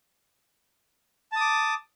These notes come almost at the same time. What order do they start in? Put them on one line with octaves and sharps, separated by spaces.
A5 D#6 D6